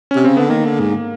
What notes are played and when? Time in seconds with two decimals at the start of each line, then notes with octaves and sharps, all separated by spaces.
0.11 C3 C#4
0.24 C#3 C4
0.37 D3 B3
0.50 D#3 A#3
0.65 D3
0.80 G#2